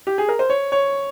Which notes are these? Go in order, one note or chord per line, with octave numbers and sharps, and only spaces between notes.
G4
G#4
A#4
C5
C#5
C#5